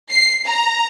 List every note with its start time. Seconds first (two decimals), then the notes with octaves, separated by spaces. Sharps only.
0.10 C7
0.47 A#5